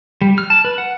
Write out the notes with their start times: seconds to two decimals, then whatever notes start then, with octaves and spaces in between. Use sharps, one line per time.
0.22 G3
0.38 F6
0.50 A5
0.65 B4
0.78 F#5